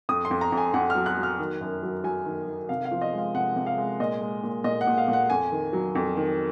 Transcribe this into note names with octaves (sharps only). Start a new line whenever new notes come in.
F2 D#6
C6
F2
A#5
F2
G#5
F2 F#5
F6
F#3
F#6
F#3
F6
D#3
F#2
F#3
F#3 G#5
D#3
D#3
C3 F5
F5
F3
D#5
G#3
F5
C3 F#5
C3
F5
G#3
A#2 D#5
G#3
A#2
A#2 D#5
F#5
A#2
F5
A#2
F#5
F2 G#5
D#3
F#3
F2
D#3